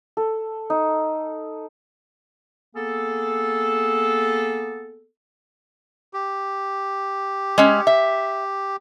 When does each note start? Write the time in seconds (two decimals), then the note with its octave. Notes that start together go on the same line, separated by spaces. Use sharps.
0.17 A4
0.70 D#4
2.75 A#3 B3 G#4 A4
6.14 G4
7.58 G#3 C#4
7.87 E5